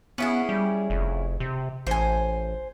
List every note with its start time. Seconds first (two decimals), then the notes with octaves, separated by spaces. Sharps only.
0.18 B3 C#4 E4 G#4
0.49 G3
0.90 F1
1.40 C3
1.87 A1 C5 G#5